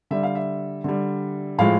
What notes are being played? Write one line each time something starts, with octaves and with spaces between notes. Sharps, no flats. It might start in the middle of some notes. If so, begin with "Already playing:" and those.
D3 G3 E5
F5
E5
D3 G3
A2 F3 G#3 F5